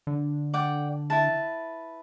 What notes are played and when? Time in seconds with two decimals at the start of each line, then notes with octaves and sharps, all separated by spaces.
0.07 D3
0.54 D5 F#5 G5
1.10 E4 B4 A5